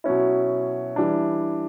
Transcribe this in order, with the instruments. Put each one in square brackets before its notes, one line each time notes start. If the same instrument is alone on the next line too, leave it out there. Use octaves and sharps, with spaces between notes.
[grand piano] B2 F#3 C#4 E4
E3 G3 D4